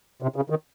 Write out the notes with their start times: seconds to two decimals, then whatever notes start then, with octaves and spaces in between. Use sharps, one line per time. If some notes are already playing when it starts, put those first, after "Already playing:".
0.22 C3
0.36 C#3
0.50 D#3